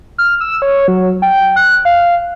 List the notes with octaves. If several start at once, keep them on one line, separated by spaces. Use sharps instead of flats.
F6
E6
C#5
F#3
G5
F#6
F5